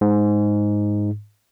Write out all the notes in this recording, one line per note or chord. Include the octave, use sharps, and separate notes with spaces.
G#2